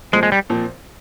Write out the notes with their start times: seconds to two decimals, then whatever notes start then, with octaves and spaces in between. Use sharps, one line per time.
0.13 A#2 F3 G#3 C4
0.23 G#3
0.32 G3
0.50 A#2 F3 C4